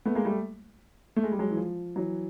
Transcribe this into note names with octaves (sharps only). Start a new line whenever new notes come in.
A3 B3
G#3 A#3
G3 A3
A3
G#3
G3
F#3 G#3
E3
F3
E3 F#3